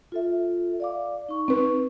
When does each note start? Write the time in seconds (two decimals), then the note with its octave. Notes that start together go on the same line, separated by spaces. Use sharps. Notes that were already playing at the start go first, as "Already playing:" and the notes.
0.12 F4 A4 E5
0.80 D5 F5 D6
1.29 D#4 C#6
1.48 C4 B4